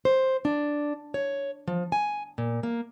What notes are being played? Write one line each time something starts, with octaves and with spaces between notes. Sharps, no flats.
C5
D4
C#5
F3
G#5
A#2
A#3